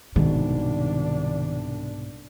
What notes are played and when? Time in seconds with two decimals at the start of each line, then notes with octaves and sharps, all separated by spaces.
0.16 C2 G#2 B2 D#3 D4